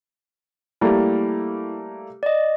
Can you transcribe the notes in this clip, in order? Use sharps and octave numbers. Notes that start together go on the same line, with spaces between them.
G3 A3 A#3 E4
D5 D#5